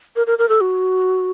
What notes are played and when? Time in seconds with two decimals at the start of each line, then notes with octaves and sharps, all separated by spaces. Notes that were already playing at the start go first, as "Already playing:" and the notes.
0.16 A#4
0.27 A#4
0.39 A#4
0.49 A4
0.61 F#4